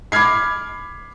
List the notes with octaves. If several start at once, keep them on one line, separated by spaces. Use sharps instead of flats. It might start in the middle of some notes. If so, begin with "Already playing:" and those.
B5 D6 F6 G#6 C7